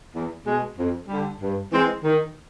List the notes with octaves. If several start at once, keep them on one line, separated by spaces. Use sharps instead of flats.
E2
B2 G#3
F2
D3 G3
G2
E3 G#3 C4
D#3